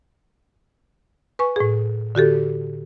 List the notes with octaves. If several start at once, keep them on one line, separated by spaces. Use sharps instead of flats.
B4 G#5 C#6
A2 G#4
D3 F#4 G4 A4